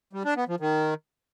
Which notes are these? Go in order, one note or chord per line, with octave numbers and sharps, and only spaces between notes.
G3
D4
B3
F3
D#3